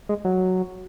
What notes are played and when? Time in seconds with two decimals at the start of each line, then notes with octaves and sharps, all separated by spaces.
0.09 G#3
0.24 F#3